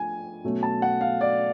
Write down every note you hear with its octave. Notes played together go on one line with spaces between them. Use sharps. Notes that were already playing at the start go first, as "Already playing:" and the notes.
Already playing: F3 A3 D4 G#5
B2 F#3 A3 C#4
A5
F#5
F5
D5